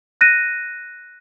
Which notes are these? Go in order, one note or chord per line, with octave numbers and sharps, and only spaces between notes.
F#6 A#6 D#7